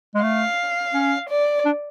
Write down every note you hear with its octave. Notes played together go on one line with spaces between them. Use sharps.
G#3
A3 F5
C#4
D5
D4